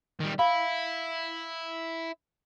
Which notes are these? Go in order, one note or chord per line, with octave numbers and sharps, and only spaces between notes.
D#3 G3
E4 F5 B5